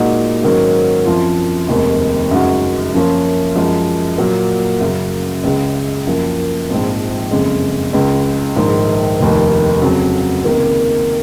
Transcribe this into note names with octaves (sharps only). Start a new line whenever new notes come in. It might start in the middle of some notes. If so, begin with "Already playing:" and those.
Already playing: A#2 G#3 D#4 F#4
G#2 D#3 F#3 A#3 C#4
F#2 F3 C4 F4
F1 D#2 D#3 G#3 C4
F#2 C#3 G#3 D#4 F#4
F#2 F3 A#3 C#4 F4
F#2 F3 G#3
A#2 F#3 A#3
F#2 C#3 F#3
C#2 C#3 G#3
F#2 F3 A#3
A#1 G#2 F3 C4
F#1 F2 C#3 G#3
C#2 C#3 G#3
A#1 G#2 D#3
F1 D#2 D#3 A#3
F2 C#3 F#3
C#2 C3 D#3 A#3